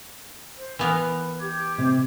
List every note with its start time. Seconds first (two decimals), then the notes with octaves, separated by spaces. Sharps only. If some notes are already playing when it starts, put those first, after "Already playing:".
0.56 C5
0.79 E3 B3 A#4 B4
1.39 G4 D6 G#6
1.78 C3